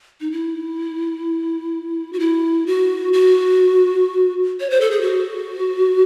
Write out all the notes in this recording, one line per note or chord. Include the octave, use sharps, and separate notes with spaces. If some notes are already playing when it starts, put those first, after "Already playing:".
D#4
E4
F#4
E4
F#4
F#4
C#5
C5
A4
G#4
F#4